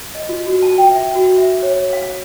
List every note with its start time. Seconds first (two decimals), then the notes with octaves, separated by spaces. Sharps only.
0.15 D#5
0.29 F4
0.47 F#4
0.62 A5
0.78 G5
0.91 E5
1.15 F#4
1.38 E5
1.62 C#5
1.93 F5